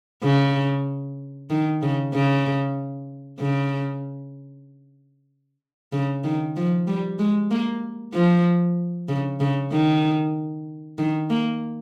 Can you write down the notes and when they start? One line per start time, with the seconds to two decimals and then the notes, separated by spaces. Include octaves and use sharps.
0.23 C#3
1.50 D#3
1.82 C#3
2.14 C#3
3.40 C#3
5.93 C#3
6.24 D#3
6.56 F3
6.87 G3
7.19 G#3
7.51 A#3
8.14 F3
9.08 C#3
9.40 C#3
9.72 D#3
10.98 D#3
11.30 A#3